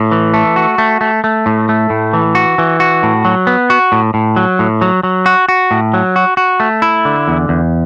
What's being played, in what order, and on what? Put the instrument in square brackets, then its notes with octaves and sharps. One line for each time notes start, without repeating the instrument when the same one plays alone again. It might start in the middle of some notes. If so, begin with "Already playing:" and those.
Already playing: [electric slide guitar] A2
E3
A3
F#4
A3
A3
A3
A2
A3
A2
E3
F#4
E3
F#4
A2
F#3
B3
F#4
A2
A2
F#3
A2
F#3
F#3
F#4
F#4
A2
F#3
F#4
F#4
A3
E4
D3
E2
E2